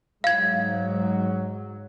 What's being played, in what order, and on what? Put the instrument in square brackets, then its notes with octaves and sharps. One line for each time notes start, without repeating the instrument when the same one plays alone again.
[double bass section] G#2 F#3 [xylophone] F5 G#6